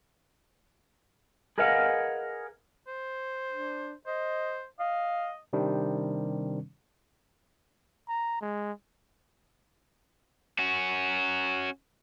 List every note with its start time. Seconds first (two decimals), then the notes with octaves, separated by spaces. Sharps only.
1.58 G#4 A#4 B4 D#5 F5 F#5
2.87 C5
3.50 D4
4.07 C5 D#5
4.79 D#5 F5
5.53 C3 D#3 G3 C4 D4
8.09 A#5
8.41 G#3
10.59 C#4 F#4